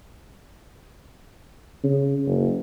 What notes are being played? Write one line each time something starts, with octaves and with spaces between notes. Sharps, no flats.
C#3
F#1